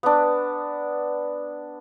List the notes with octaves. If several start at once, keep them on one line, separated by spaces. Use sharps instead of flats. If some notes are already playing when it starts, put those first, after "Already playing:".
B3 D4